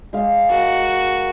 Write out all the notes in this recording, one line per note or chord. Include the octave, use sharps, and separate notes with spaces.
G#3 F5
F#4 A#4